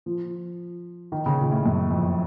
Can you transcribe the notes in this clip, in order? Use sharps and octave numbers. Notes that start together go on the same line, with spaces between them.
F3
D#3
C#3
A#2
A2
F#2
F2